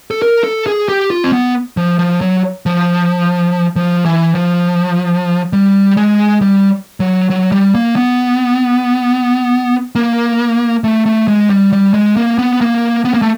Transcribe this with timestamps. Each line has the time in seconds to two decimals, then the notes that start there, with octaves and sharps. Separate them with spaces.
0.11 A4
0.22 A#4
0.44 A4
0.67 G#4
0.89 G4
1.10 F4
1.24 C4
1.33 B3
1.77 F3
1.99 F3
2.21 F#3
2.66 F3
3.76 F3
4.05 E3
4.35 F3
5.53 G3
5.97 G#3
6.41 G3
7.00 F#3
7.30 F#3
7.52 G3
7.75 A#3
7.96 B3
9.95 A#3
10.84 A3
11.06 A3
11.28 G#3
11.50 G3
11.73 G3
11.94 G#3
12.16 A#3
12.38 B3
12.61 A#3
13.05 B3
13.14 A#3
13.22 A3